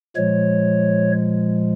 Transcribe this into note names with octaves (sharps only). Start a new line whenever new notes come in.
A#2 F3 G#3 C#5